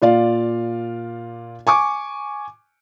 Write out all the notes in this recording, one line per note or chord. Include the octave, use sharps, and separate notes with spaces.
A#2 F4 D5 F5
G#5 C#6 D6